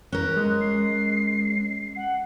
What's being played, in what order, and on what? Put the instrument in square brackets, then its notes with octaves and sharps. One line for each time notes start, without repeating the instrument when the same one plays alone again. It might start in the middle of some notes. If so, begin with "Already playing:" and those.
[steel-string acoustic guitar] C#4 A#4 [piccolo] F#6
[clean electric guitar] G#3
[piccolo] C7
F#5